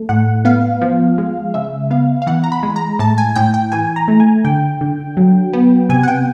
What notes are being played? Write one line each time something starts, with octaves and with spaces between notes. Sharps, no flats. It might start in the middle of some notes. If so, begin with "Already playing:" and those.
Already playing: A3
A2 F#5
B3 F5
F3
G#3
C#3 E5
B3 F5
F5
E3 F#5
A#5
B5
G#3
A#5
A2 A5
G#5
A2 G5
G5
E3 G#5
A#5
A3
G#5
D3 G5
D3
F#3
B3
C3 G#5
F#5
G5